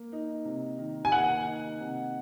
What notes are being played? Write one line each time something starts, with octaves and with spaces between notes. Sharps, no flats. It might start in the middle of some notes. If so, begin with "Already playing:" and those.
Already playing: A#3
D#4
C3
D#3
G#5
A#3 F#5
D#4
C3